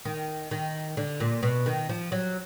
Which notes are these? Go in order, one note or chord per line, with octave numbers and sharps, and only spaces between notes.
D#3
D#3
D3
A#2
B2
D#3
F3
F#3